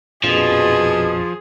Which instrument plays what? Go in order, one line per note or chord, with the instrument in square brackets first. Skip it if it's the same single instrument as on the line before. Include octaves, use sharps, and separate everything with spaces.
[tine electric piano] A#1 F2 [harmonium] B2 [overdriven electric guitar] F3 [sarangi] G#4